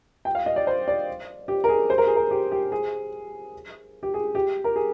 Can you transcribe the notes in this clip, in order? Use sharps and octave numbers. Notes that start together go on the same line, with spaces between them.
G5
F5
D#5
D5
C5
D5
G4
A#4
G#4
C5
A#4
G#4
A#4
G4
G4
G#4
G4
G#4
G4
A#4
G#4